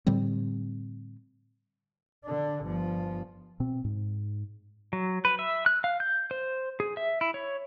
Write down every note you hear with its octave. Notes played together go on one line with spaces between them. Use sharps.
A2 D3 G3 C4
D3 D4
G1 F3
B2 C4
G#2
F#3
B4
E5
F#6
F5
G6
C5
G#4
E5
E4
C#5